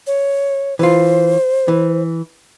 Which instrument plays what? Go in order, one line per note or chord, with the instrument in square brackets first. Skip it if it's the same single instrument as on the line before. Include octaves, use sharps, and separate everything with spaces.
[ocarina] C#5
[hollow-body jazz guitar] E3 F4 [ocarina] C5
[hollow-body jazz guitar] E3